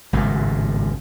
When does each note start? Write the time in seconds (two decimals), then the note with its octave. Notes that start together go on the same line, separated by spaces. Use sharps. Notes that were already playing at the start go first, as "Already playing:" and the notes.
0.13 G#1 C#2 F#2 A2